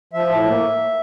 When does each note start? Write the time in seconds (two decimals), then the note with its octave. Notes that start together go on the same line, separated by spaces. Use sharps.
0.13 F3 E5
0.30 A2
0.46 A#3